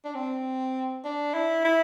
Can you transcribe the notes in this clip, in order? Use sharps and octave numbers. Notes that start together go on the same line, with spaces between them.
D4
C4
D4
E4
E4